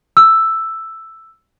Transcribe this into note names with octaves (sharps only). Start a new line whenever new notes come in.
E6